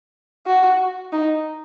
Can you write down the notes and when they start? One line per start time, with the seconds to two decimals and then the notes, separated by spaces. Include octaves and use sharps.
0.47 F#4
1.12 D#4